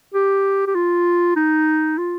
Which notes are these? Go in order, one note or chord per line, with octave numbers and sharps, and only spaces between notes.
G4
G4
F4
D#4
F4